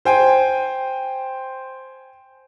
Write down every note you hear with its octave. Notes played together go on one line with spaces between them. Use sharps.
C5 G5 G#5